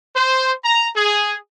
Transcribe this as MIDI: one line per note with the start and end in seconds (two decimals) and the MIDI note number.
0.15 0.51 72
0.63 0.88 82
0.95 1.35 68